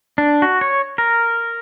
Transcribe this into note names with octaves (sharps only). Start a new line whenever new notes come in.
D4
F#4
C#5
A#4